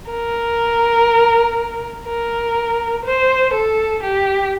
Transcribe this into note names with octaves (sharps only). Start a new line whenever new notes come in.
A#4
A#4
C5
A4
G4